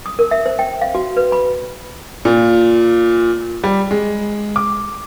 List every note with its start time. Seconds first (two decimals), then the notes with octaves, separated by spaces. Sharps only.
0.06 D#6
0.19 A#4
0.31 E5
0.46 C5
0.59 G5
0.82 F5
0.95 F#4
1.17 B4
1.32 B5
2.25 A#2
3.64 G3
3.91 G#3
4.56 D6